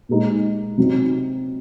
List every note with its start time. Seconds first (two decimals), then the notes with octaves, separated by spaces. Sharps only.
0.09 A#2 G#3 D#4
0.78 C3 F#3 C4 D#4